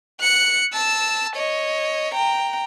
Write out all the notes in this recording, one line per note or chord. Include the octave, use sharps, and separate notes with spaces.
F#6 C#7
A5 E6
C#5 D#5
G5 A#5